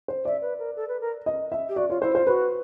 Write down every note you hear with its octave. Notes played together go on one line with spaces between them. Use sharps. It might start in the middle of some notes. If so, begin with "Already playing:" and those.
C5
D5 E5
B4
A#4
A4
B4
A#4
D#5
E5
G4
F#4 D5
F4 C#5
E4 C5
F4 C5
F#4 B4